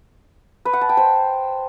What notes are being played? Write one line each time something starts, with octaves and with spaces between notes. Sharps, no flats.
B4
F#5
A5
G5
C5